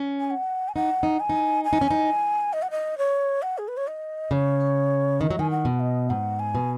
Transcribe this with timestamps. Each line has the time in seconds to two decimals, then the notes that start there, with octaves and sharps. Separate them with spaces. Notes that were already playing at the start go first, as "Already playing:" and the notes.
Already playing: C#4
0.20 G#5
0.31 F#5
0.69 G#5
0.75 D#4 F#5
1.03 D#4
1.20 G#5
1.29 D#4
1.64 G#5
1.73 D#4
1.81 C#4
1.91 D#4
2.53 D#5
2.62 F#5
2.71 D#5
2.98 C#5
3.42 F#5
3.58 G#4
3.68 B4
3.77 C#5
3.87 D#5
4.31 C#3 C#5
5.21 D#3 D#5
5.31 F#3
5.39 D#3 G#5
5.51 F#5
5.65 B2
5.80 D#5
6.09 G#2 F#5
6.39 G#5
6.55 B2